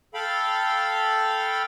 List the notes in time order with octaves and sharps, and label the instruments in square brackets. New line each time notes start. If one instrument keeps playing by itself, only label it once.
[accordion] A4 F5 G5 B5